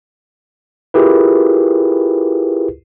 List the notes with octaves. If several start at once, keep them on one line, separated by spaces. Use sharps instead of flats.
E4 F4 G4 G#4 A#4 B4